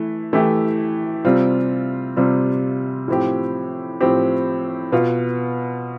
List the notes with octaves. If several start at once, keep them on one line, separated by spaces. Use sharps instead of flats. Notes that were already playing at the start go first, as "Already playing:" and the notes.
Already playing: E3 A3 E4
E3 A3 E4 G4
C3 G3 C4 F4
C3 G3 C4 F4
A2 F3 C4 G4
A2 F3 C4 G4
B2 B3 F4